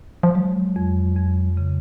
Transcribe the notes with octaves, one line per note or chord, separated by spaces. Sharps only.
F3
F#3 G#3
F2
F2
C#3